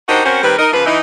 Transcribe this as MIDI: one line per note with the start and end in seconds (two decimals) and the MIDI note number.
0.09 0.23 62
0.09 0.23 63
0.09 0.23 66
0.09 0.23 67
0.09 0.23 70
0.09 0.23 72
0.25 0.43 60
0.25 0.43 61
0.25 0.43 66
0.25 0.43 70
0.25 0.43 72
0.43 0.55 51
0.43 0.55 55
0.43 0.55 60
0.43 0.55 70
0.43 0.55 71
0.59 0.70 63
0.59 0.70 70
0.59 0.70 75
0.73 0.84 49
0.73 0.84 53
0.73 0.84 58
0.73 0.84 71
0.86 1.00 52
0.86 1.00 63